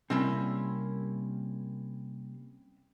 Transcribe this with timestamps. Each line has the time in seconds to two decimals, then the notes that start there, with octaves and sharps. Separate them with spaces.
0.10 C3 G3 A#3 C4 C#4 E4